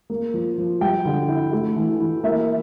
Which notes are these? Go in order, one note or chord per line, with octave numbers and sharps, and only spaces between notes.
A#3
F3
F3
G3 G5
D3
E4
A3
E3
E3
A#3 E5